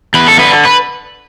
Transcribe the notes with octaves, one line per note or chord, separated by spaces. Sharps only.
E2 B4
A4
D3 B4
B4